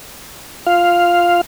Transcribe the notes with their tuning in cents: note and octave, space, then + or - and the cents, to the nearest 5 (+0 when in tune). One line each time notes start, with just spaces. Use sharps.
F4 +0 F5 +0